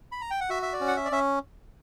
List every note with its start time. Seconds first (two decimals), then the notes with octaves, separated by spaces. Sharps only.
0.12 B5
0.21 A#5
0.30 G5
0.41 F#5
0.50 F#4 E5
0.63 E5
0.73 D5
0.81 C#4
0.88 F#5
0.97 E5
1.05 D5
1.12 C#4 E5